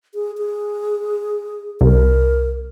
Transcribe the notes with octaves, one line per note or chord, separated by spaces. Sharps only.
G#4
G#4
C2 A#4